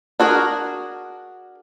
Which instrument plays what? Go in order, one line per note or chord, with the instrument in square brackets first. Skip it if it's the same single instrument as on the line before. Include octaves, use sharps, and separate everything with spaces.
[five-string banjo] D4 F#4 G#4 A#4